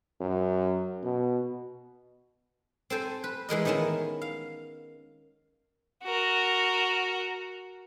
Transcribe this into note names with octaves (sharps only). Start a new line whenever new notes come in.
F#2
B2
C4 A4 C5 G#5
B4
E3 G#3 A#4 D#5
D#3 B3 C#4 E4 A#4
F5
F#4 A#4